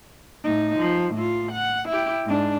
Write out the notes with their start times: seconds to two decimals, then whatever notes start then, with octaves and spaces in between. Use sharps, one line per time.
0.44 A2 D#4
0.79 F3
1.14 A2 F4
1.52 F#5
1.88 E4 G4
2.26 G#2 D4